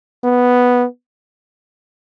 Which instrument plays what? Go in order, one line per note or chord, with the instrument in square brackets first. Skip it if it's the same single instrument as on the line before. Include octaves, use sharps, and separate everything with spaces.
[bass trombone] B3